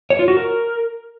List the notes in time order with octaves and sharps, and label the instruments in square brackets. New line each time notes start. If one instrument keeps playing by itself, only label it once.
[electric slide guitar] C#5
F4
F#4
A#4